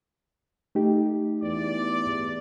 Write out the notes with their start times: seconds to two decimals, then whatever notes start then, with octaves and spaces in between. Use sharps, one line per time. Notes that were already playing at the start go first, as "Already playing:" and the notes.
0.75 A3 D#4 G4
1.42 E2 D5